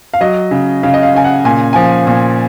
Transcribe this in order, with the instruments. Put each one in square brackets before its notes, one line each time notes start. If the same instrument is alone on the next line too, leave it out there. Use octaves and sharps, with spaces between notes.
[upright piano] F5
F#3 D#5
C#3
C#3 F5
D#5
F5
C#3 G#5
F#5
A#2 G#5
F3 G#5
A#2